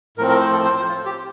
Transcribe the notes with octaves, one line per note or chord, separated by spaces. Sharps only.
A2 F3 C4 A#4
A#4
C5
A4
C5
C5
F4
G4